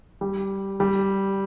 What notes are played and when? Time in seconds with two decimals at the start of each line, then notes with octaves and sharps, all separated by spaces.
0.21 G3
0.80 G3